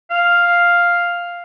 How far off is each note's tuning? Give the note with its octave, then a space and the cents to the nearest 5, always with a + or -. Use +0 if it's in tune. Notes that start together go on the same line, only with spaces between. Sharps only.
F5 +0